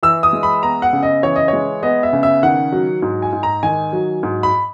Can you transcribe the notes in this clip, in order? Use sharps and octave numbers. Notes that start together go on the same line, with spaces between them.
E3 E6
D#6
G#3
B5
B3 A#5
F#5
C#3
D#5
E3 C#5
D#5
C#5
G#3
B3 D#5
E5
C#3
E5
D#3 F#5
F#3
G#2
G#5
G#2
A#5
D#3 G#5
F#3
G#2
B5